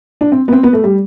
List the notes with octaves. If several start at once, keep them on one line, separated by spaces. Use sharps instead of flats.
D4
C4
B3
C4
B3
A3
G3